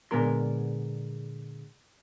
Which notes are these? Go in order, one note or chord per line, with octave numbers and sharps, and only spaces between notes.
A#2 D3 G#3 B3 A#4 C6